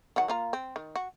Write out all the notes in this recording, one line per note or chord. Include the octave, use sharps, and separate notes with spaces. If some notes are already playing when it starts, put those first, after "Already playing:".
D#3 F#3 F#5
A#3 F4 A#5
C4
D#3
F#4